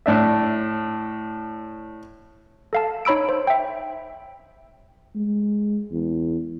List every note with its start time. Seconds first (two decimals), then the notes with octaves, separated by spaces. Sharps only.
0.06 A2 D4 E5
2.73 A4 F5 A5
3.05 D#4 C#5 B5 E6 D7
3.29 C5
3.47 E5 G5
5.15 G#3
5.91 E2